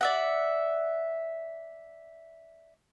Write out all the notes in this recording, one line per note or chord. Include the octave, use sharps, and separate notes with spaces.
D5 E5 F#5